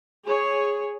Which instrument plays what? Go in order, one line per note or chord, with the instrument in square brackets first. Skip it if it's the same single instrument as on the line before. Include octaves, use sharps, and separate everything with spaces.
[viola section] G#4 C#5